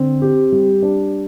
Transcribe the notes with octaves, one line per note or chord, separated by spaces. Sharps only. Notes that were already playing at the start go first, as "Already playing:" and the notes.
Already playing: D3 C4
G4
G3
D4